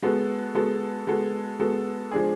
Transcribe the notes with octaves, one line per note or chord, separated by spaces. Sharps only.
G#3 B3 F#4 A4
G#3 B3 F#4 A4
G#3 B3 F#4 A4
G#3 B3 F#4 A4
F3 G#3 D4 G#4